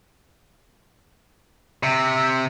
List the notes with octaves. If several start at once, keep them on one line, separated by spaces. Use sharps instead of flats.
C3